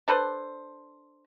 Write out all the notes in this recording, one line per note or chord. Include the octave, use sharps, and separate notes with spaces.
D4 A4 B4 C5